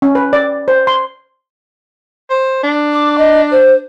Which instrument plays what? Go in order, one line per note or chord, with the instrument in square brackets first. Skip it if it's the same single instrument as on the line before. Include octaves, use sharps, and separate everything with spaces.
[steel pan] C#4
B4
D5
C5
C6
[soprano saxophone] C5
D4
[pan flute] D6
D#5
C5